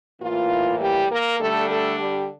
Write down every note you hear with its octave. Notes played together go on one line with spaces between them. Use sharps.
A2 E3 A#3 F4
G3 G4
A#3 A#4
D3 G3 A3 D4 A4
A3 A4
G3 G4